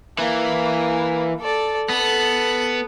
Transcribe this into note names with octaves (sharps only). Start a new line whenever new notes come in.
E3 A#3
A4 D5
B3 A4 F#6